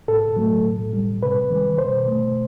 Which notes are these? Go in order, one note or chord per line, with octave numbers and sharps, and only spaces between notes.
A2 A4
F#3 A3
A2
G3
C3 B4
D#3 G3
B2 C5
A3